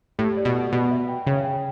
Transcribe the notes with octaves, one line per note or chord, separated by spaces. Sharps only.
A2 G4
D5
B2
F#5
B2 B5
E5
G5
C#3 C#5
G5